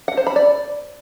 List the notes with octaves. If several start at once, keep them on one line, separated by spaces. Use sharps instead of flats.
F#5
C5
B5
D5